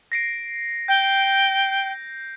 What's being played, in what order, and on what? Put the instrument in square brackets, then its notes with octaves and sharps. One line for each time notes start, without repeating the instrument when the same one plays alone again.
[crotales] A#6 C7 D7
[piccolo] G5 [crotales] G6